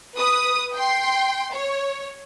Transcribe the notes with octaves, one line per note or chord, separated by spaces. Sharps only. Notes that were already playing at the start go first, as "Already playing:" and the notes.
B4 D#6
G5 C6
C#5